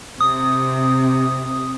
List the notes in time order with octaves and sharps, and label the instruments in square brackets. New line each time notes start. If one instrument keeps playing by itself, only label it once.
[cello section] C3 [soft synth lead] D#6